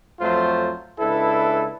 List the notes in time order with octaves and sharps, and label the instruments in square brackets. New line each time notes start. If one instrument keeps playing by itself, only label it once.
[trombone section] F2 F#3 A3 F4 C5
C#2 D4 E4 A4 B4